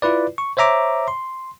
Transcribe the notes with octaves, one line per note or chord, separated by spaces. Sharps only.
E4 F4 B4 D5
C#6
C5 C#5 E5 A#5 D6
C6